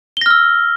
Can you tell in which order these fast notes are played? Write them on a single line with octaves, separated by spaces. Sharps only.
G7 A#6 F6 E6